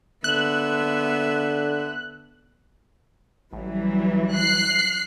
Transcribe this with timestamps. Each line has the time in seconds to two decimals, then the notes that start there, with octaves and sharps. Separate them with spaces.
0.24 D3 B3 E5 F#6
3.53 A1 E3 F#3 G3
4.33 F#6 C7